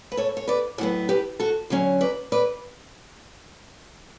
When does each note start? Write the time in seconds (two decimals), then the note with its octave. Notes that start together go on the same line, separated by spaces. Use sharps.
0.12 B4
0.17 A4 C#5
0.37 C#5
0.48 B4 D5
0.78 A2 F#3 B3 D5 F#5
1.09 G4 B4
1.40 F#4 A4
1.70 D3 F#3 C#4
2.01 B4 D5
2.32 B4 D5